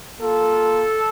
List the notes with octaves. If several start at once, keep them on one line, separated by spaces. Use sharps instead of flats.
A#3 F4 A4